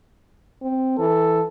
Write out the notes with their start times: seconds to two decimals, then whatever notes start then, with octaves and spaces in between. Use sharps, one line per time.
0.62 C4
0.99 E3 A4